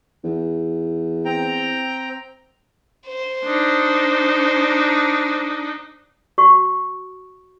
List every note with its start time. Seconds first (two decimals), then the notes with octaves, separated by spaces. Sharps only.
0.24 E2
1.25 C4 G5 A#5
3.07 C5
3.45 D4 D#4
6.38 F#4 C#6